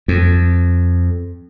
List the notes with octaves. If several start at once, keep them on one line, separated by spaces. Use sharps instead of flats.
F2